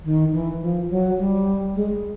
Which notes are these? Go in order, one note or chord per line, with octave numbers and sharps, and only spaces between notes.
D#3
E3
F3
F#3
G3
G#3